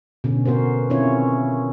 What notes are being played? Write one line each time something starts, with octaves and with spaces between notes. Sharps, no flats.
B2 D3 C#4
B3 F#4 A#4 C5
D#3 C4 C#4 E4 F4 C#5